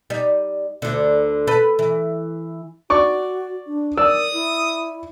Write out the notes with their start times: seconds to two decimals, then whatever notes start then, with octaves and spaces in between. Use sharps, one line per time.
0.10 G3 D#4
0.82 D2 D3
1.47 A4 B4
1.79 E3
2.90 F#4 D5 C#6 D6
3.67 D4
3.97 A#4 D5 D#6 E6
4.33 E4